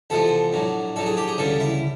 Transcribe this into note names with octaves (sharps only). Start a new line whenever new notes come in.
E2 C3 F3 G#3 A4
A#1 A2 F#3
A#1 A2 F#3 A4
G#4
G4
G#4
D2 C#3 E3 G3 A4
E4